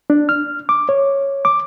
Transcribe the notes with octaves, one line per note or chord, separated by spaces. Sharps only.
D4
F6
D6
C#5
D6